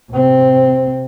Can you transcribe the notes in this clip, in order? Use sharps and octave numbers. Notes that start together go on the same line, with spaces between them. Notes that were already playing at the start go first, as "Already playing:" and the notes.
C3 C4